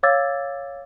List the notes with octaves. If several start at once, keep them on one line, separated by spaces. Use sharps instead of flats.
C#5 F5 D6 E6 G#6 A6